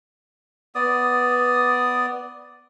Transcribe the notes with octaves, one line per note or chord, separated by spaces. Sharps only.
B3 D5 D#6